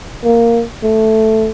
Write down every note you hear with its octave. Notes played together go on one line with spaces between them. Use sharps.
A#3
A3